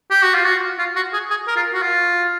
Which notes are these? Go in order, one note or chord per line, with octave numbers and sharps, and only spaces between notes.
G4
F#4
F4
F#4
F4
F#4
G#4
G#4
A#4
F4
F#4
F4